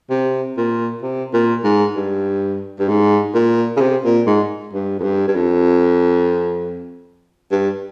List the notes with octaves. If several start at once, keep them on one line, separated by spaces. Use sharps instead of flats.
C3
A#2
C3
A#2
G#2
G2
G2
G#2
A#2
C#3
C3
A#2
G#2
G2
F2
G2
G2
F2
G2